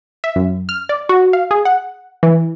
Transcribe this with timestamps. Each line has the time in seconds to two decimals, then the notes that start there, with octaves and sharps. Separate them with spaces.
0.24 E5
0.36 F#2
0.69 F6
0.89 D5
1.09 F#4
1.33 F5
1.51 G#4
1.65 F#5
2.23 E3